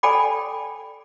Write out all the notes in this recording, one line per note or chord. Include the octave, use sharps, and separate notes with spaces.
A4 D5 G5 G#5 B5 D6